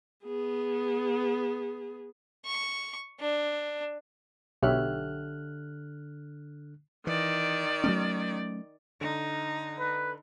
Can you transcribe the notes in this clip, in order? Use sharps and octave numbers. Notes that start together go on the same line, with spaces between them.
B3 G#4
C#6
D4
B1 D3 G4 C#5 E5 F6 F#6
D#3 E3 D5
F#3 A3 C#4
D3 D#4
B4